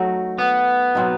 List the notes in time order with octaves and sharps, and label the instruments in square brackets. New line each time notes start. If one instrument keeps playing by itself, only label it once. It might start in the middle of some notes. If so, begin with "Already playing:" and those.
Already playing: [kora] F#3 A3 D#4 F#4
[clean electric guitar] B3
[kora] B2 F#3 C4 D#4